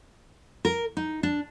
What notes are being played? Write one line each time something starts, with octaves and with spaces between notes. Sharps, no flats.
A#4
D#4
D4